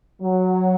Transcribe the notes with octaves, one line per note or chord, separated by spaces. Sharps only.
F#3